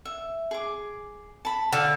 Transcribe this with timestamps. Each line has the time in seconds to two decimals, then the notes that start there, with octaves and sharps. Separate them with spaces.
0.05 E5
0.51 G#4 D6
1.45 A5 B5
1.73 D3 F5